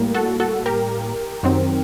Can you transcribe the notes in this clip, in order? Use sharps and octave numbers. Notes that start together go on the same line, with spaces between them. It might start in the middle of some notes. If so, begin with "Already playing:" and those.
Already playing: A2 G3 A#3
F#4 A4
F#4 A4
G4 A#4
F#2 D#3 F#3 C4